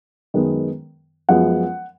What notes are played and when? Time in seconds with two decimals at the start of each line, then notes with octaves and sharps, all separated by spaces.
0.34 F#2 D#3 G#3 B3
1.29 F#2 F3 G#3 B3 F#5